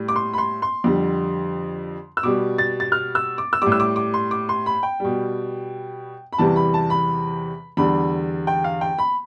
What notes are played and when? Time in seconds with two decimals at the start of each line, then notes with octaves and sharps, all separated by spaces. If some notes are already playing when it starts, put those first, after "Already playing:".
Already playing: A2 G3
0.08 D6
0.16 C6
0.33 B5
0.38 C6
0.62 C6
0.84 F2 D3 G3
2.17 E6
2.23 B2 G3 D6
2.58 A6
2.80 A6
2.92 F6
3.15 E6
3.38 D6
3.53 E6
3.62 A2 G3 D6
3.72 E6
3.80 D6
3.96 D6
4.14 C6
4.31 D6
4.49 C6
4.66 B5
4.83 G5
5.00 B2 G3
6.33 B5
6.38 E2 C3 E3 G3 A5
6.56 B5
6.74 A5
6.90 B5
7.77 E2 D3 G3 B5
8.47 G5
8.64 F5
8.81 G5
8.98 B5